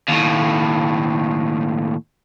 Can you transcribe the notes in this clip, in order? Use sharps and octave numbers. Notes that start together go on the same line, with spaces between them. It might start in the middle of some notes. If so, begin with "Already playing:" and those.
D#2 A2